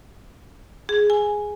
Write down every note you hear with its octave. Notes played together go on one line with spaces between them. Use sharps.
G#4
G#5